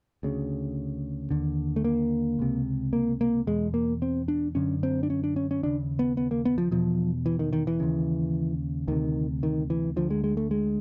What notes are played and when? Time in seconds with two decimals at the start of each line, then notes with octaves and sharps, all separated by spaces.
0.23 D2 C#3
1.30 D#2 D3
1.76 A3
1.84 A#3
2.39 C#2 C3
2.93 A#3
3.21 A#3
3.47 E2 B2 G#3
3.74 A#3
4.02 C4
4.28 D4
4.55 F#2 D3 C#4
4.83 C4
5.03 D4
5.10 C#4
5.24 D4
5.36 C#4
5.51 C#4
5.63 D#2 C#3 D4
5.99 B3
6.17 B3
6.31 A#3
6.45 B3
6.58 F3
6.71 E2 B2 F3
7.26 E3
7.39 D#3
7.53 D#3
7.67 E3
7.80 D#2 C#3
8.88 D2 C3 D#3
9.43 D#3
9.70 E3
9.96 D2 D3 F3
10.10 G#3
10.24 G#3
10.37 A3
10.51 G#3